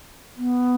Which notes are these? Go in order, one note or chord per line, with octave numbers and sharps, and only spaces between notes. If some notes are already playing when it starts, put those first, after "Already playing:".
B3